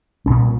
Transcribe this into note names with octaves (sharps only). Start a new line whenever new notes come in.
C2 A#2 C#4